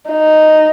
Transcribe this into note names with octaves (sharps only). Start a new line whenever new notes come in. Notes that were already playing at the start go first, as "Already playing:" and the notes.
D#4